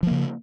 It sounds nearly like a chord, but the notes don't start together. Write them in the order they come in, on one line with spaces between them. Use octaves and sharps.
F3 A#3 C#3